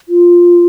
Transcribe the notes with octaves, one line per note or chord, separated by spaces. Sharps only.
F4